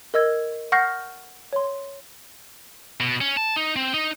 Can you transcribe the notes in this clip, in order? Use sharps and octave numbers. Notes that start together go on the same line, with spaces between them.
A#4 D#5 E6 G#6
F#5 C#6 F6 G6 A#6 C7
C#5 C6
B2
C#4
A5
D#4
C4
D#4